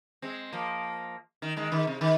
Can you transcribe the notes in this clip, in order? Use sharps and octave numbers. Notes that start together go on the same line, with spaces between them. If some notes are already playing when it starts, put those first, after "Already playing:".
G#3 C4
F3 A#3
D#3
D#3 G#3
D#3
C3
D#3